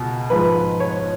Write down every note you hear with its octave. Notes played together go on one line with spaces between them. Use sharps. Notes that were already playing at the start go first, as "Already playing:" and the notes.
Already playing: C#2 B2
G#2 F3 B4
C#5